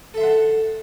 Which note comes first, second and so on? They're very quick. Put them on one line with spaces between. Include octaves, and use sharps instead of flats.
A4 E5 C6 F#5 A5